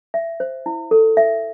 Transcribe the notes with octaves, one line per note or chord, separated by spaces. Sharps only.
E5
C5
E4
A4
E5